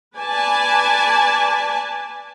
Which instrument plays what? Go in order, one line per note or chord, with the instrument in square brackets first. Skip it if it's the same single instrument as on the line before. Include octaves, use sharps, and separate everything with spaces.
[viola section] B4 D5 G#5 A5